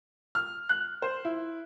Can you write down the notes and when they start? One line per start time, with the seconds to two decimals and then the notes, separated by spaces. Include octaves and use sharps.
0.35 F6
0.69 F#6
1.02 C5
1.25 E4